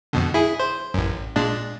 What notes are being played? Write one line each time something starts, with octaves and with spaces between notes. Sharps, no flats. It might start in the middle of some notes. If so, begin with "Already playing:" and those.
F2 B2 D3
E4 G#4
C5
A1 F#2
A#2 G#3 D4